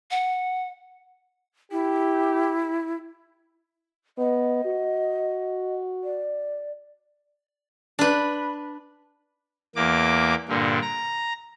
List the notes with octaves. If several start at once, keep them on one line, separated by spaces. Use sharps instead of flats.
F#5
E4 G4
B3 D#5
F#4
D5
D4 B4
E2 A#3 D6
G2 A#2 D3
A#5